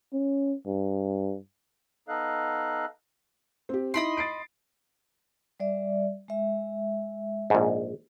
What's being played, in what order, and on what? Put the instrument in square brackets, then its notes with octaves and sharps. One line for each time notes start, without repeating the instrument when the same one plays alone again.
[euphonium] C#4
G2
[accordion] B3 D#4 A4 D#5 F5 F#6
[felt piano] C4 G4
[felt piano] D#4 E4 D7 [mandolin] D#5 B5 C6
[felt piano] A6 C7 D7
[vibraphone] G3 D5 E5
G#3 E5
[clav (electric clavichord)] A#1 G#2